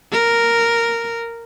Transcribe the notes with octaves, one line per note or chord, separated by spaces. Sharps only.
A#4